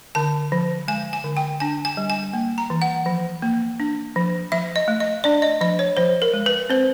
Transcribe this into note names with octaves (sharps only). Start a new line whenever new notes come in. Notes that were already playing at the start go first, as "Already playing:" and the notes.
D3 A5
F3
G#3 G#5
G#5
D3
G5
D4 G#5
G#5
G3
G#5
A#3
A#5
E3
F#5
F3
A#3
D4
F3
F3 E5
D#5
A3
D#5
D4 D5
D#5
F3 D#5
C#5
F3 C5
A#4
G#3
B4
C4 C5